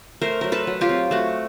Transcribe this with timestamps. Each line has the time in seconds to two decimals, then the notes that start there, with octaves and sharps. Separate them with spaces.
0.21 A3 A#4 C5
0.41 F#3 A#4
0.52 A4 B4
0.67 F#3
0.81 F4 G4
0.89 C4
1.11 A3 F#4